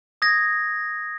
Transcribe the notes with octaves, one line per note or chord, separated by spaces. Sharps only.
D#6 G#6 A#6